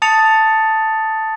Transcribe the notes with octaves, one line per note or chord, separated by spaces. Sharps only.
A5 D#6 A6 C#7 F7